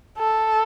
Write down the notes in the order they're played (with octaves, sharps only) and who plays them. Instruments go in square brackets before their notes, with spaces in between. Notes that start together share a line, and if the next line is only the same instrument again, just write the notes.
[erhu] A4